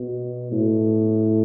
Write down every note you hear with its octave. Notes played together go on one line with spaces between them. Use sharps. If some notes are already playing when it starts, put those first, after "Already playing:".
Already playing: B2
A2